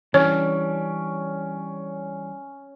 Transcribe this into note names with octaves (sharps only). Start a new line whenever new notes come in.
E3 G3 C#4 D4 C#5